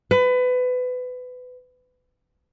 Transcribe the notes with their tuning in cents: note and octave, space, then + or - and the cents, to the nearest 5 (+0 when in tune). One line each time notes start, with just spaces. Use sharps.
B4 +25